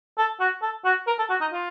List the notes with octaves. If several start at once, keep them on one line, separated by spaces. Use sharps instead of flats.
A4
F#4
A4
F#4
A#4
A4
F#4
D#4
F4